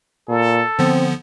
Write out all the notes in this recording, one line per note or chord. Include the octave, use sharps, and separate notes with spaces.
A#2 A4
D3 F3 B3 C4